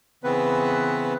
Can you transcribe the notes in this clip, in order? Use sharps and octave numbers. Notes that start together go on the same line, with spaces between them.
C#3 E3 B3 C4 B4